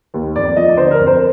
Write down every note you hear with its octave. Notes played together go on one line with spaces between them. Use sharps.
D#2
F2 D5
F3 D#5
D5
D3 C5
A#4
F2
C5